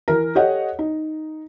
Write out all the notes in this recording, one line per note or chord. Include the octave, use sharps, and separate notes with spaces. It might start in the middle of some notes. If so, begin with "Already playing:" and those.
E3 A#4
G4 A4 C#5 D#5 F#5
D#4